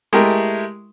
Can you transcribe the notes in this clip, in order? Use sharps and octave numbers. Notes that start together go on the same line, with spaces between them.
G#3 A3 E4 G4 A#4